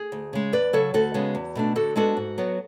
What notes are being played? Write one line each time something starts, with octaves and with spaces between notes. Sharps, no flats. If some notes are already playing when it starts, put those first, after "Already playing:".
Already playing: G#4
D2
C#3 G#3
E2 B4 D5
C#3 F#3 A4 C#5
D2 F#4 A4
C#3 G#3 B3
E2
B2 A3 D4
D3 F#4 A4
G#3 B3 D4 F#4 A4
G#2
F#3 B3